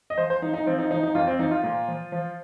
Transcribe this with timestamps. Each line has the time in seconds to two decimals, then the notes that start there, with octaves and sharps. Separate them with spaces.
0.10 D#5
0.17 F3 C5
0.30 C5
0.42 F3 D#4
0.54 D#4
0.66 F3 C4
0.79 D#4
0.91 F3 D#4
1.03 D#4
1.15 F2 F4
1.27 C4
1.39 F3 D#4
1.51 F4
1.63 A#2
1.88 F3
2.12 F3